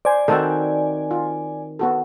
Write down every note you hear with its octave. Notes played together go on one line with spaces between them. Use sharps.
C5 D5 G#5
D#3 C4 F#4 A4
F4
B3 F#4 A4